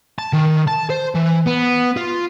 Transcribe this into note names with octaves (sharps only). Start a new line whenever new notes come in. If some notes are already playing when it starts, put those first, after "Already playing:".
A5
D#3
A5
C5
E3
B3
F4